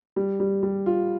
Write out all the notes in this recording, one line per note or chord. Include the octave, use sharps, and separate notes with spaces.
G3
G3
G3
F4